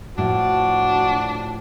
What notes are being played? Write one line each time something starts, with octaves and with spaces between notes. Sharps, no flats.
A2 F3 D4 F#4